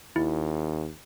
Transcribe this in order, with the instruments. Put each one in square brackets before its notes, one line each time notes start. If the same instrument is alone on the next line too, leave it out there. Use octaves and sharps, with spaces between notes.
[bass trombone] D#2 [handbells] E4